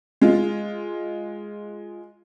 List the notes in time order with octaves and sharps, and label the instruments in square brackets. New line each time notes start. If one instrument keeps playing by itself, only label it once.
[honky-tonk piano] G#3 F4